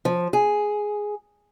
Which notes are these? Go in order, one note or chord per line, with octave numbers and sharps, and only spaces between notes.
F3
G#4